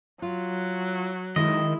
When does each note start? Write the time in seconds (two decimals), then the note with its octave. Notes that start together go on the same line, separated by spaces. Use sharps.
0.22 F#3 F4
1.36 D#3 G#3 E4 D#5